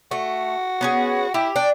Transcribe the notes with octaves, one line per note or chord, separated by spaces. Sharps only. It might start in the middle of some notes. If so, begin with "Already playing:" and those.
A3 F#4
B3 C#4 G#4
E4 G4
D4 G5